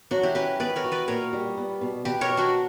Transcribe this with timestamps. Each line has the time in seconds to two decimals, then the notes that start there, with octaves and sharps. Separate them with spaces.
0.11 F#3 D4 F#4
0.23 E4 G4
0.35 C#4 G4 B4
0.60 B3 B4 D5
0.76 A#4 C#5
0.84 F#4
0.92 B4 D5
1.08 A#2 A#4 C#5
1.33 G3
1.57 B3
1.81 B2
2.05 B2 G4 B4
2.21 A#4 C#5
2.30 F#3
2.37 D4 F#4